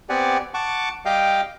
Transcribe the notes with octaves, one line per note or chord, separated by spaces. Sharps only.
B3 C4 G4 D5 F#5 G#5
F#5 A5 C#6 D6
G3 G4 D#5 F5 G5 D6